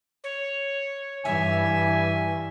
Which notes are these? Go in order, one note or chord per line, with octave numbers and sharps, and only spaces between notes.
C#5
G2 E3 E5 G#5